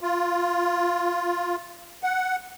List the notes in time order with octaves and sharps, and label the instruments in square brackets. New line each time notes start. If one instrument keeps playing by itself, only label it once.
[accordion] F4
F#5